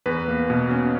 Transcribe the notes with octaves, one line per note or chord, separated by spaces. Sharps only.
E2 B4
A#3
B2
C#4